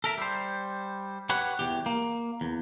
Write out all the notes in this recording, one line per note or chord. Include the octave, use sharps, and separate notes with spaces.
A4 A#4 E5
G3 C5
G4 B4 C#5 F#5
E2 G4
A#3
E2